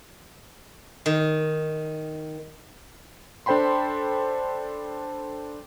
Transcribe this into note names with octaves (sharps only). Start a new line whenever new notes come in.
D#3
D4 A4 C5 G5 B5 C6